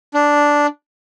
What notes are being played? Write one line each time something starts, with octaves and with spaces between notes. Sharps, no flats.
D4